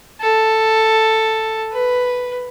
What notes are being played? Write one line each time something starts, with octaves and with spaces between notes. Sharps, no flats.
A4
B4